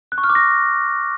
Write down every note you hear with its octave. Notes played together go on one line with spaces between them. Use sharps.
F#6
C#6
F6
D6
A#6